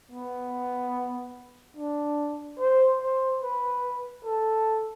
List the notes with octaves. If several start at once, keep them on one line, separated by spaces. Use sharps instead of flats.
B3
D4
C5
C5
B4
A4